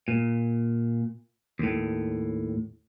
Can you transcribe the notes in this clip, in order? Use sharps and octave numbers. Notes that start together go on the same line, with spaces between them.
A#2
D#2 A2